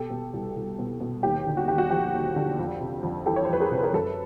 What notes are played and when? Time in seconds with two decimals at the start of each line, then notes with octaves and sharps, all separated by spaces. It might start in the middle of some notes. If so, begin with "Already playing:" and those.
Already playing: B2 G4 A4
0.10 B2
0.33 C2
0.56 C2
0.79 B2
1.00 B2
1.23 D#2 G4
1.47 D3
1.57 F#4
1.68 D#2 G4
1.78 F#4
1.90 F3 G4
2.14 D#2
2.36 D3
2.59 F2
2.81 C3
3.03 F2
3.26 E3 G4 A4
3.36 C#5
3.45 C5
3.49 F2 B4
3.60 G#4 A#4
3.71 C3
3.83 A#4
3.94 F#2 A4 B4